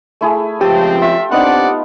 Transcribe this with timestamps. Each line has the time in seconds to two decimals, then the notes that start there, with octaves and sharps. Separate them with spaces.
0.21 A3 E4 G#4
0.61 C#2 F3 C4 G4 G5 A5 D#6
1.02 F4 E5
1.31 B3 C4 D4 D#4 D5 F#5